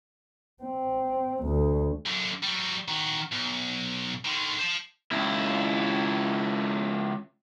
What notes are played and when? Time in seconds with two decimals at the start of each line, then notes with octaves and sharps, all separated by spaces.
0.63 C4
1.44 D2
2.06 F#2 D3
2.43 F#3 G3
2.88 D#3 F#4
3.32 B1
4.25 D3 D#3
4.59 C5 A5
5.12 C#2 E4